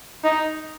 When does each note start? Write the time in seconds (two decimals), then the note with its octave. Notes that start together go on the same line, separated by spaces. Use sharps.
0.24 D#4